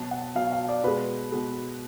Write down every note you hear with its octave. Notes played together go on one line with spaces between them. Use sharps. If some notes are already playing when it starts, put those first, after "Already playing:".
Already playing: B2 F#3 A5
F#5
B2 F#3 F5
F5
D5
B2 G#3 B4
B2 G#3